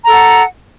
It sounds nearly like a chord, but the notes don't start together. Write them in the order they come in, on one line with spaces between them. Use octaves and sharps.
A#5 A4 F#5